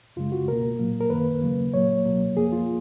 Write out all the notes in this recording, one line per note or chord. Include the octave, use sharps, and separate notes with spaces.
F#2 C#3 G#3 F4
F#4
C#2 B2 A#3 A#4
A#2 F#3 A#3
A#4
F#2 D#3 A#3 B4
D#2 C#3 F#3 A#3
A#2 F#3 A#3 C#5
C#2 B2 F#3 A#3
F2 F3 A#3 G#4
F4